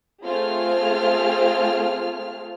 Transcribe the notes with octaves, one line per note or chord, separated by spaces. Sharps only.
A3 C4 F4 G#4 F6